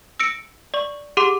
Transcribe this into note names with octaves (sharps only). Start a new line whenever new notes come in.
E6 A#6 C#7 D7
D5 C#6
G4 G#4 F#5 C6 D6